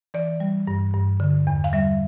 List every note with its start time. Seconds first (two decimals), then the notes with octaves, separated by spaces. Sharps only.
0.14 E3 D5
0.40 G3
0.67 G2
0.94 G2
1.20 D3
1.47 E2
1.64 F5
1.73 G3 E5